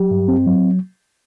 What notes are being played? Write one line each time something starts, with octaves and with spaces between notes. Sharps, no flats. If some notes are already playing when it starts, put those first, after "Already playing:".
Already playing: F#3 G4
G2
C4
F#3